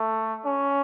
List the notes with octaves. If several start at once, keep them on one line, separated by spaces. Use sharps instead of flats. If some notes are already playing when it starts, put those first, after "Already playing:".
Already playing: A3
C#4